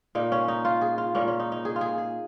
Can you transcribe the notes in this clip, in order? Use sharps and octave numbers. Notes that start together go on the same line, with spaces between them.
A#2 A#3 D#4
C#4
D#4
F4
G#4
F4
A#2 A#3 C#4
C#4
D#4
D#4
G#4
F4
G#4
G#4